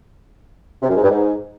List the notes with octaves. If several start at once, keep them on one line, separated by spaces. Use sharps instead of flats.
C3
F#2
G#2
G2
G#2